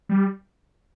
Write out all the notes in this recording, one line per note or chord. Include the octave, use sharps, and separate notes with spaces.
G3